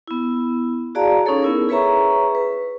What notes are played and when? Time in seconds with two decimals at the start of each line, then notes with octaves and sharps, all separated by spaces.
0.08 B3 E4
0.95 F#4 G#4 D5 F5 A5 A#5
1.26 C#4 D#4 G#4 A4 C#5
1.42 B3 E4 A#4
1.69 G#4 B4 C#5 E5 A#5 C#6
2.35 B4